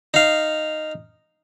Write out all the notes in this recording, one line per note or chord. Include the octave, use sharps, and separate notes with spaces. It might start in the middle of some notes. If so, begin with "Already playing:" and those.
D#4 F5